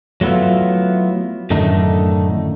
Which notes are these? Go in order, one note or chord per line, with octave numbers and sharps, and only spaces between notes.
F#3 A3 B3 E4 F4
F#2 A2 D3 D#3 A3 D#4